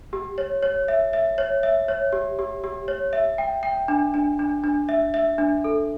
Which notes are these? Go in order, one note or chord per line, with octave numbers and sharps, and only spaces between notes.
G4
C#5
C#5
E5
E5
C#5
E5
C#5
G4
G4
G4
C#5
E5
G5
G5
D4
D4
D4
D4
E5
E5
D4
A4